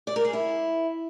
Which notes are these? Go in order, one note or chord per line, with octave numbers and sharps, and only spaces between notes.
D5
A#4
G#4
E4